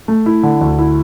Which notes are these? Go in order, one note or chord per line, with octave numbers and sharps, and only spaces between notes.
A3
E4
D3
D2
E4